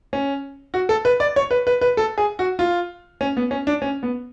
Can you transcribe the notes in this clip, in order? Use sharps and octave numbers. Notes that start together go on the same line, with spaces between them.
C#4
F#4
A4
B4
D5
C#5
B4
B4
B4
A4
G#4
F#4
F4
C#4
B3
C#4
D4
C#4
B3